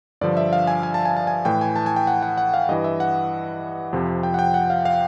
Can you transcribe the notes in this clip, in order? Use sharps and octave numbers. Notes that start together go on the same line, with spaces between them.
G2 D3 F3 D5
E5
F5
G#5
G#5
A5
G#5
A5
G#5
A2 E3 G5
G#5
A5
G#5
G5
F#5
F#5
F#5
F5
G2 E3 D#5
E5
F#5
F2 C3 F3
G5
F#5
G5
F#5
F5
F5